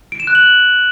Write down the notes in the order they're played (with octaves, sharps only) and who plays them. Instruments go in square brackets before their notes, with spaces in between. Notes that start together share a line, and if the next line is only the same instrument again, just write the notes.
[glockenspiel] D7
E7
F#6
F#7